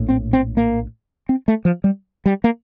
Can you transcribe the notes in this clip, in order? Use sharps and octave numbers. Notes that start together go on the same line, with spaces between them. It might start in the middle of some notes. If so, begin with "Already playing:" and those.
Already playing: A#1 A2
C4
C4
A#3
C4
A3
F3
G3
G3
A#3